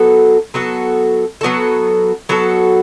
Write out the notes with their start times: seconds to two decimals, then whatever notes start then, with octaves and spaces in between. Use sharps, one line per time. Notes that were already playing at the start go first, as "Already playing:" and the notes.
Already playing: F#3 B3 F#4 A4
0.54 F#3 B3 F#4 A4
1.41 F#3 B3 F#4 A4
2.29 F#3 B3 F#4 A4